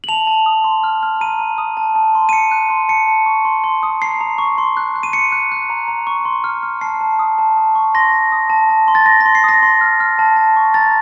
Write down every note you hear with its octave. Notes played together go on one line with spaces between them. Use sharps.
F#7
A5 F7
A5
D#6
C6
F6
F6
A#5 D#7
A#5
D#6
A5
A5
C6
D#7
A5 C#7
F#6
C6
A5 C#7
A5
C#6
C6
C6
D#6
A#5 C7
A#5
C#6
C6
F#6
F#6
D#7
C6 C#7
F#6
F#6
A#5
A#5
C#6
C6
F6
F6
A5 C7
A5
D#6
A5
A5
C#6
C6 A#6
C6
D#6
A5
A5
C6
A6
C6 A#6
A#6
C6
C7
D#6 A#6
C6
F6
F6
A5
A5
C#6
A#5 A6